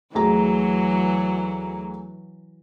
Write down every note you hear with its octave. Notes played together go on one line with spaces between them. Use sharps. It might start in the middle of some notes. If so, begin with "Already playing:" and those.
D2 E3 F#3 G#4 A#5